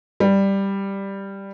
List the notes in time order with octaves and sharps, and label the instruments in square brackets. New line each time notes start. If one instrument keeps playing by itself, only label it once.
[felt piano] G3